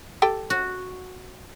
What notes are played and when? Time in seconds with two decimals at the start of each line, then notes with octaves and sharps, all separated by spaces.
0.22 G4 A4 G5
0.50 F#4